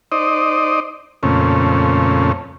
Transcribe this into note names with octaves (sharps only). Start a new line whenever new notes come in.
D#4 C5 D5 D#5
F2 A#2 C#3 A3 C4 C#4